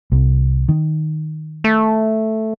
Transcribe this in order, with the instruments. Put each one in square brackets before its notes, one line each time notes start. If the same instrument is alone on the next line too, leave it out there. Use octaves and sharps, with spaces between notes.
[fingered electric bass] C2
D#3
[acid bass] A3